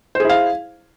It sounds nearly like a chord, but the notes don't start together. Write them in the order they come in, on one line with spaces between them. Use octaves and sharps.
C5 G#4 E4 F5